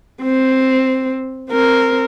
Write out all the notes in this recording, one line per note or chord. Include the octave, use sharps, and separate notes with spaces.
C4
C4 A#4